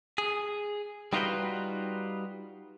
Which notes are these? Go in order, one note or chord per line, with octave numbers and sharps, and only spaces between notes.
G#4
G3 D#4 F4 F#4 B4 G5